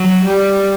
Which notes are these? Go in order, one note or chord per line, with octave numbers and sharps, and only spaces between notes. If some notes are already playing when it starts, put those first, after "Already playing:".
Already playing: F#3
G3